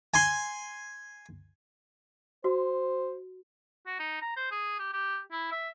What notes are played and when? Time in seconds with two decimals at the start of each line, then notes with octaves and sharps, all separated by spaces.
0.14 G#5 C6
2.44 F#4 C5
3.86 F#4
3.99 D#4
4.21 A#5
4.36 C5
4.52 G#4
4.79 G4
4.93 G4
5.32 E4
5.51 E5